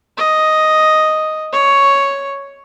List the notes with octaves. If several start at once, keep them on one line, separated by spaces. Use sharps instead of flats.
D#5
C#5